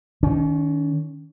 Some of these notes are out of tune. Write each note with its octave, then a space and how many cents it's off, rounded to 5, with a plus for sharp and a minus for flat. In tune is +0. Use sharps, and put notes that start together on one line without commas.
D#3 +0 C#4 +40